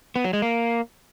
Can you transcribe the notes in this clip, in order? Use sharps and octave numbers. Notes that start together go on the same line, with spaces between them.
B3
F#3
G#3
A#3